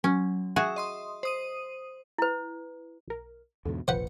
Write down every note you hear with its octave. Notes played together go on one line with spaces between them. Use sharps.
F#3 C#4
F#4 G#4 E5
D#5 C6 D#6
C5 D#6 D#7
E4 B4
B1 A#4
E2 G#2 B2 D3
F1 A#1 F4 B4 C5 F#5 C#7